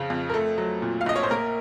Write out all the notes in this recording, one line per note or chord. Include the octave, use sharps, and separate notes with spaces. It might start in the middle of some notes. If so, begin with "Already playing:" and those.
Already playing: F2 C#3 F3 F5
F2
A#4
A3 A4
F#3
A#2
F5
A#1 D#5
C#5
C5
A#3 A#4